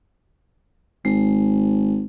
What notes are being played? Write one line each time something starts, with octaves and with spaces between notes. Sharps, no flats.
G#1 G#3